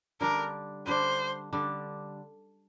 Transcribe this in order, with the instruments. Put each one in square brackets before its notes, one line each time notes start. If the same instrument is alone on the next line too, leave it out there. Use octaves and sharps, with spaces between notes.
[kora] D3 G3 D4 [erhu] A#4
[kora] D3 G3 D4 [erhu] C5
[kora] D3 G3 D4